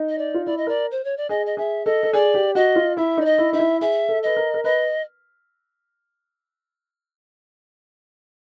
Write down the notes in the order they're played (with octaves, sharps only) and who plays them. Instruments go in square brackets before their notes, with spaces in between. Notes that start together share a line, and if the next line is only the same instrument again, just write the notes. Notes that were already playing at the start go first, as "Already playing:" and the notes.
Already playing: [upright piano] D#4
[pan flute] D#5
D5
[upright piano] F4
[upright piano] E4 [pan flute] D5
[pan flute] D#5
[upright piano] A#4 [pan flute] D5
[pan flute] C5
C#5
D5
[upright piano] G#4 [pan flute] D#5
[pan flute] D#5
[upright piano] G#4 [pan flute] E5
[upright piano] A4 [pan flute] D#5
[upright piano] A4
[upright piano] G#4 [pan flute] D5
[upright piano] G4
[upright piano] F#4 [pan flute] D#5
[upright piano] F4
[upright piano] E4 [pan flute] E5
[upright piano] D#4 [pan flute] D5
[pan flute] D#5
[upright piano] E4
[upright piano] D#4 [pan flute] E5
[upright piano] E4
[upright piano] G#4 [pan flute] E5
[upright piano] A4
[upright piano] B4 [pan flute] D#5
[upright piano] A#4
A#4
[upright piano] B4 [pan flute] D#5